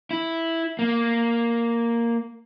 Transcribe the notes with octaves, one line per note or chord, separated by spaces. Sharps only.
E4
A#3